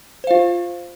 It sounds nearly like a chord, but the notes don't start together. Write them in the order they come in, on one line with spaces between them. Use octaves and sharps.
C5 F5 F4